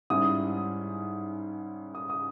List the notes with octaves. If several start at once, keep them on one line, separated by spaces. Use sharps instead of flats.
G#2 G3 C#4 E4 D#6
D#6
D#6